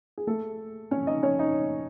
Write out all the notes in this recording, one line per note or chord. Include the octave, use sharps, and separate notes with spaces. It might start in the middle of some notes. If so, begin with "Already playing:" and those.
G#4
A3 A4
C#4 C#5
D#4 D#5
C#4 C#5
D#4